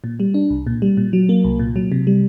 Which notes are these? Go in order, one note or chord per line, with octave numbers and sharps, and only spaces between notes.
A#2
G3
D4
C2
A#2
G3
A#2
F#3
A#3
C2
A#2
F#3
C3
G3